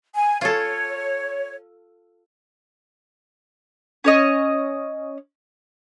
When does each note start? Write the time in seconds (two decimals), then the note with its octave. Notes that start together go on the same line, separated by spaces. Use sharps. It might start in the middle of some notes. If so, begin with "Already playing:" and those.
0.15 G#5
0.41 F4 A4 C#5
4.04 C#4 C#5 D#5